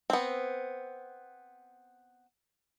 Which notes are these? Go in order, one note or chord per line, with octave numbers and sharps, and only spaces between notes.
B3 C4